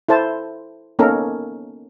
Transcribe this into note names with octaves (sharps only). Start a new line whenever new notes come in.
E4 A4 C5 A5
A#3 B3 C#4 D#4 A4 A#4